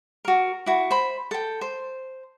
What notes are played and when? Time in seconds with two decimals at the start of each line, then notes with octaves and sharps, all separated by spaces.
0.25 F#4 A#4
0.66 E4 F#4
0.91 C5 B5
1.31 A4 G5
1.61 C5